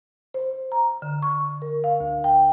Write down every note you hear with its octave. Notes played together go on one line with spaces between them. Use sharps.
C5
A#5
D3
C#6
A#4
F5
D2
G5